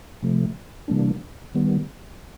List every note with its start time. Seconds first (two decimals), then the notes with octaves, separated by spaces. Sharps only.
0.23 C3 F3 A3
0.88 C3 E3 G3 A#3 D4
1.55 D#3 G3 B3